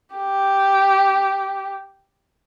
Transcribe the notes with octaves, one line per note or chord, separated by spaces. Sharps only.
G4